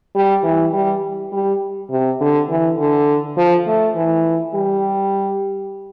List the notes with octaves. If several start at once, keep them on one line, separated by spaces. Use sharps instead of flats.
G3
E3
G3
G3
C3
D3
E3
D3
F3
A3
E3
G3